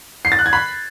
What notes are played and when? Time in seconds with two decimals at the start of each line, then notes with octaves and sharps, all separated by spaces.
0.25 C7
0.32 A6
0.39 F#6
0.46 G#6
0.53 B5